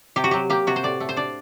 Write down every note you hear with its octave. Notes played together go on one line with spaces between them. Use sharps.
C3 G4
F#4
F#3 G4
A#3 G4
C3 F#4
C5
A2 D5
A3
C5
D4 D5